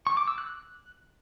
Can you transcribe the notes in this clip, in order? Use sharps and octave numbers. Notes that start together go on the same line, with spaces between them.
C#6
D6
E6
F#6